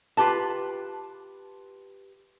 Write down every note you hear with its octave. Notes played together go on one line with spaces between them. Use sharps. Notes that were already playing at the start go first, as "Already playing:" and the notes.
F4 G4 B4 A5